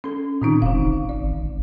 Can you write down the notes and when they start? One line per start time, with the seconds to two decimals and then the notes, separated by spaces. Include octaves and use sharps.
0.04 C#4 A4
0.42 A#2 D#3 C4 D#4
0.62 E1 D3 F5
0.82 G#1
1.09 D5
1.33 G#1